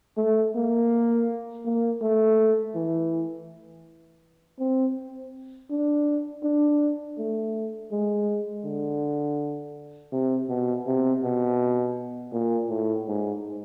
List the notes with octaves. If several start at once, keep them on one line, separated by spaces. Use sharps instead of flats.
A3
A#3
A#3
A3
E3
C4
D4
D4
A3
G#3
D3
C3
B2
C3
B2
A#2
A2
G#2